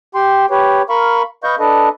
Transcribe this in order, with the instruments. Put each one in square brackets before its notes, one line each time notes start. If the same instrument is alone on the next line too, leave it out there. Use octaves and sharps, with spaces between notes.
[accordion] G4 G5 C6
G4 B4 C#5
A#4 F5 B5 C#6
B4 D#5 F5 C#6 G6
D4 A4 B4 D#5